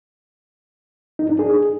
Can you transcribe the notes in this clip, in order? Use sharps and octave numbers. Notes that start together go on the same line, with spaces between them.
D#4
D4
G#4